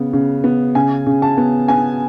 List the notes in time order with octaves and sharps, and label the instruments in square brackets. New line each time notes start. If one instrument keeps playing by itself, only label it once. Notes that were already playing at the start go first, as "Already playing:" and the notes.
Already playing: [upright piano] C#3 B3
C#3
B3
C#3 G#5
C#3
A5
B3
B3 G#5